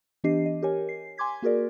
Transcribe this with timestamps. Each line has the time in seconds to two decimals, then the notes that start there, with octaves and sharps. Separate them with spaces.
0.24 E3 B3 D4 G4 D#5 C7
0.46 D#5
0.62 G4 A#4 C#5 G#5
0.89 C7
1.18 G#5 C6 D6 G#6 B6
1.42 A#3 F#4 G#4 A#4 D5